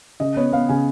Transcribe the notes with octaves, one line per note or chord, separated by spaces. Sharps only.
C#3 D#5
B3 C#5
B3 F5
C#3 G#5